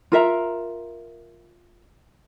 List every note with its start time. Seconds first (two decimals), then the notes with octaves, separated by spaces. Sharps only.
0.12 F4 A#4 E5 A#5